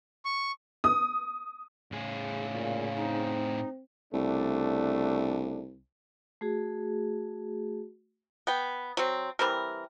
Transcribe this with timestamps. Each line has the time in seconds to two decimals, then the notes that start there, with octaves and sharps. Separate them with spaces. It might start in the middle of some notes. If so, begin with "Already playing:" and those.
0.25 C#6
0.84 D#6
1.92 A2 C#3 G#4
2.53 A#2
2.96 C4 D#4
4.14 C2 C#3 A3 D4
6.41 A3 F#4 G#4
8.47 B3 G5
8.97 F#3 C4
9.39 E3 G3 C4 A#4